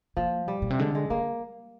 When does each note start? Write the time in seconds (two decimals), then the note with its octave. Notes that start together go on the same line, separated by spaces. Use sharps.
0.17 F3 A#3
0.48 G3
0.53 G#2
0.62 A#2
0.70 C3
0.79 D3 G#3
0.95 G#3
1.10 D3 A#3